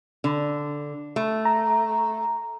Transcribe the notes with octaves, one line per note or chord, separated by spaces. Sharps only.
D3
A3
A#5